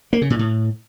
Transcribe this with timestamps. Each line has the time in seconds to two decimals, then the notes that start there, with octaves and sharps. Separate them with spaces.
0.13 A#3
0.22 C#3
0.30 A#2
0.39 A2